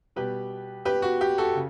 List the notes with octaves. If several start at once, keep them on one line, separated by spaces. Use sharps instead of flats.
B2 G3 G4 B4
G4 B4
F#4
G4
F#4 A4
C#3